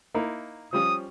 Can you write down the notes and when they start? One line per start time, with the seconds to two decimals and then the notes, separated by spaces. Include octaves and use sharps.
0.14 A#3 D#4 E4
0.73 F3 G3 C#4 D#6